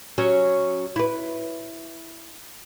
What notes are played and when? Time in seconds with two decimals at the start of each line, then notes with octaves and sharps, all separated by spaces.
0.18 F#3 C#4
0.96 E4 B4